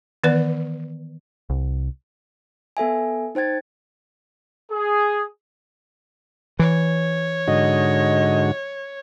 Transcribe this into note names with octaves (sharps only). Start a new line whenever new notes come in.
D#3 E3 B3 B4 D5
C2
B3 A4 E5 G#5
D#4 C5 G5 G#6 A6
G#4
E3 C#5
G#2 D3 F#4 D#5